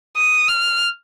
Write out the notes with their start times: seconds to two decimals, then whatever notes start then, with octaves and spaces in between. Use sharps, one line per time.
0.17 D#6
0.48 F6